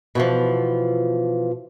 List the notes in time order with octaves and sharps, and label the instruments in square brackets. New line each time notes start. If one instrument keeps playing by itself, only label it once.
[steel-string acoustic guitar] B2 E3 F3